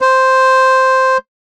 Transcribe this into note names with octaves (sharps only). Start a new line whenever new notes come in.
C5